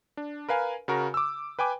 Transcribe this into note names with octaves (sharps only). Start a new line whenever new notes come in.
D4
A#4 B4 F5 G#5
C#3 F#4 A#4
D6 E6
B4 G5 G#5 D6